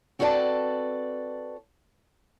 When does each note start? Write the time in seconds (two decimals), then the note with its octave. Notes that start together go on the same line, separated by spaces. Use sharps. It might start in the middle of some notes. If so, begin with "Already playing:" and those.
0.19 C4 F#4 A4 B4 D5 A5